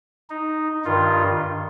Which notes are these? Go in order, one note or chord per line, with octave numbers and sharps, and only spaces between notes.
D#4
G2 D#3 F4